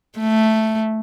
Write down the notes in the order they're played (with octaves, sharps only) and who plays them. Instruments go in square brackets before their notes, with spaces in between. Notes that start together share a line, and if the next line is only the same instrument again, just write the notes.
[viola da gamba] A3